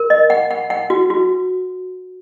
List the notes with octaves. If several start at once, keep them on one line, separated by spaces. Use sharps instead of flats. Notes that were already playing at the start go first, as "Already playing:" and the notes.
Already playing: A#4
D#5
F#5
F#5
F#5
F#4
F#4